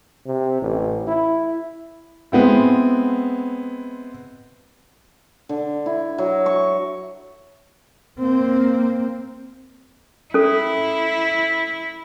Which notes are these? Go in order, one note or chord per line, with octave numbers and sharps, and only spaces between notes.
C3
A1
E4
G#3 B3 C4 E4
D3
E4
F#3
C#6
A#3 C4
C#4 E4 A4